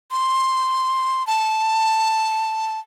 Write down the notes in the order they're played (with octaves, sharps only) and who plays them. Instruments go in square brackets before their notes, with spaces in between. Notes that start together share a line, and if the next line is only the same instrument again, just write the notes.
[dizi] C6
A5